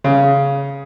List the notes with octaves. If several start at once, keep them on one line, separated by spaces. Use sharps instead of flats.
C#3